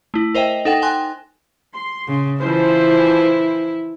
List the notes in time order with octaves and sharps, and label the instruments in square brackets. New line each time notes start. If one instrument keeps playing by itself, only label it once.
[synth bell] A3 E4
A#4 C5 D#5 E5 G5
D#4 A4 F#5 G5
G5 G#5 C6 F#6
[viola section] C6
[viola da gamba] C#3
[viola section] E3 F3 C5 [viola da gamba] E4